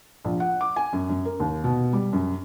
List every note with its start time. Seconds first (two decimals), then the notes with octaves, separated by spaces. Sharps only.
0.25 A#1
0.40 F#5
0.61 D6
0.76 G#5
0.93 F#2
1.09 F#2
1.25 A#4
1.40 D#2
1.64 B2
1.93 G3
2.13 F#2